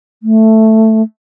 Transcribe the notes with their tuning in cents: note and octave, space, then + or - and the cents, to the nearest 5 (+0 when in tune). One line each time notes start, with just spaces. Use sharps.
A3 +5